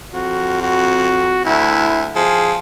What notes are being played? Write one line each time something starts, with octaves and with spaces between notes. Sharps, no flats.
F2 F#4
F#4
D2 E4
F3 G#4